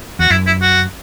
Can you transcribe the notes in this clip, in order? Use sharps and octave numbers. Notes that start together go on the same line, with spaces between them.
E2 F#4
F#2 E4
E4
F#4